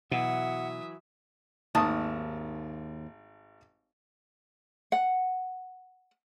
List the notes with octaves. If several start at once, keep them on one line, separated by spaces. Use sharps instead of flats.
B2 E3 F#3 E5 F#5 D#6
G#1 D#2 A5 D#6
F#5